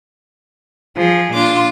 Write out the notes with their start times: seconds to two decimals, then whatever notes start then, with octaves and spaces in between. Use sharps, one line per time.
0.95 F3 G#4
1.32 A#2 D4 F4 D6